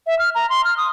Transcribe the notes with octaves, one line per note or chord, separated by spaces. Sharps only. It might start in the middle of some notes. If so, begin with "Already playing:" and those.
E5
F6
A#5
C6
F6
D#6